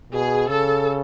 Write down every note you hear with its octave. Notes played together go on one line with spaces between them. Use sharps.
B2 G#4
C#3 A4